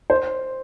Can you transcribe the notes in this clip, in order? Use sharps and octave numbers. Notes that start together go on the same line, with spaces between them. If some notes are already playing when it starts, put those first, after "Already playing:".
C5